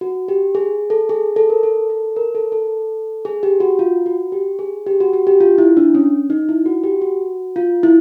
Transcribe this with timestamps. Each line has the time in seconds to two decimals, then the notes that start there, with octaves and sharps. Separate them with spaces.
0.01 F#4
0.28 G4
0.55 G#4
0.90 A4
1.09 G#4
1.36 A4
1.50 A#4
1.63 A4
1.90 A4
2.16 A#4
2.35 A4
2.52 A4
3.25 G#4
3.43 G4
3.60 F#4
3.79 F4
4.06 F#4
4.32 G4
4.59 G#4
4.87 G4
5.00 F#4
5.13 F#4
5.27 G4
5.41 F4
5.58 E4
5.77 D4
5.95 C#4
6.30 D#4
6.49 E4
6.66 F#4
6.84 G4
7.02 F#4
7.56 F4
7.83 E4